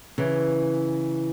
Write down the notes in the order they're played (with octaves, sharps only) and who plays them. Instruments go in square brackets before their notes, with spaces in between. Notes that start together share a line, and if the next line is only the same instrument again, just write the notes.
[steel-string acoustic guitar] C#3 E3